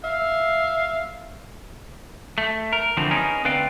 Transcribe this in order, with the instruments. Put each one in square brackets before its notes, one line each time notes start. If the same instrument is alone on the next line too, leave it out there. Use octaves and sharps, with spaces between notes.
[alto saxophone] E5 [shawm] F5
[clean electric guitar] A3
A#4
D3 E3 F3 A3 C4
B3 C#4 D#4 G#4 A#4
D2 C4 B4 D5 F5 G5